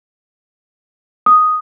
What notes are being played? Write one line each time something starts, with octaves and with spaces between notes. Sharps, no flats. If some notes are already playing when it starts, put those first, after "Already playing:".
D#6